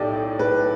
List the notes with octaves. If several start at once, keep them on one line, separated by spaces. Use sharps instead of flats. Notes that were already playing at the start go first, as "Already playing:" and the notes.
Already playing: B1 A2 E4 G4 A4 D5
B4